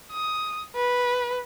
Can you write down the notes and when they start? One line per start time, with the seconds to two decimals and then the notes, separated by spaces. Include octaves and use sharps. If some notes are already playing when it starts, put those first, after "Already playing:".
0.12 D#6
0.76 B4